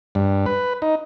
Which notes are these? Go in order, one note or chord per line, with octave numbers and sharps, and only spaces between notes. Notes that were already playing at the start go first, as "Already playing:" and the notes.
G2
B4
D#4